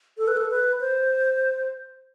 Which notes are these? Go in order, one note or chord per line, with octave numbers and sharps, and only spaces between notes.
A4
B4
A4
B4
C5